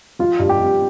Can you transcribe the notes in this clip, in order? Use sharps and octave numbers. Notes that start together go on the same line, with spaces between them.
F3 F4
G2
G4
G2